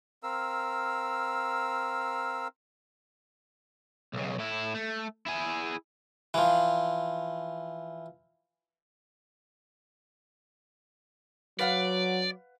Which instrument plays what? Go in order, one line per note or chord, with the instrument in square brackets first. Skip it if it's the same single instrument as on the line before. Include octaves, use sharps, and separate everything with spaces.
[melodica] C4 A#4 F5 E6
[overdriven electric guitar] B1 C#3
A2 E4
A3
E4 G#4
[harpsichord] E3 F3
[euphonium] F#3 [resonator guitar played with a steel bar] B4 F5 F#5 [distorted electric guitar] D5